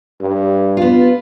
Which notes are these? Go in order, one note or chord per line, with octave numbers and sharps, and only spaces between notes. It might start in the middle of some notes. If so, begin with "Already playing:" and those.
G2
B3 F4